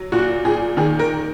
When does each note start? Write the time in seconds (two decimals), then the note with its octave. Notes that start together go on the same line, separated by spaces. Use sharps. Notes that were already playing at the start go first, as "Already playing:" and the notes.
Already playing: F#3
0.12 A#2 F#4
0.45 A#2 G#4
0.77 D#3 G#4
0.99 A#4